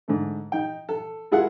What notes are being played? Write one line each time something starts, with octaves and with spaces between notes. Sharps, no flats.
G#2 D3 A3
D#4 G5
A4
G#3 E4 F4 G#4 A#4 F#5